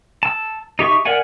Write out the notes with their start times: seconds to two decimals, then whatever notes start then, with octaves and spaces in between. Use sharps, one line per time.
0.23 A5 E6
0.79 D#4 G4 E5 C#6
1.05 A#4 D5 E5 F#5 G#5